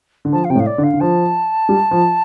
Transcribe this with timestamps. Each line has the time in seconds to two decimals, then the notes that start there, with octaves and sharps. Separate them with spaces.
0.25 D3
0.33 F3 A5
0.45 F5
0.50 C3 G5
0.55 A2
0.60 F5
0.66 D5
0.78 D3
0.83 F5
0.93 D3
1.00 F3 A5
1.69 G3
1.91 F3